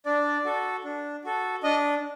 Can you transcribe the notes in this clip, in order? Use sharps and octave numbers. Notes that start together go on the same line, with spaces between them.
D4 D5
F#4 A4
D4
F#4 A4
D4 D#5